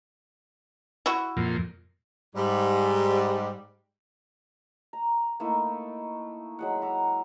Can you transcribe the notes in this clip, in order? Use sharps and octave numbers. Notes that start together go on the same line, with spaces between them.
E4 F#4
F2 A#2
G#2 G3
A#5
A3 A#3 D#4 E4
F#3 G#3 F#5
E5 A#5 D6